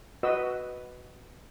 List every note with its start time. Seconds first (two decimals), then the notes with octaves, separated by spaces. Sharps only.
0.23 F#4 B4 D#5 E6